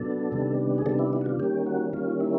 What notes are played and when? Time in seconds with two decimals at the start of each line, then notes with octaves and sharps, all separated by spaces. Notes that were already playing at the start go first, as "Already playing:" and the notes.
Already playing: B2 F#3 B3 D4 A4
0.32 C3 D#3 G3 B3 D4
0.78 G#4
0.86 C3 D#3 G3 B3 D4 A4
0.99 E4
1.13 E4
1.21 F#4
1.26 F4
1.40 D#3 G3 A#3 C#4 G4
1.66 F#4
1.93 D#3 G3 A#3 C#4 F4
2.20 E4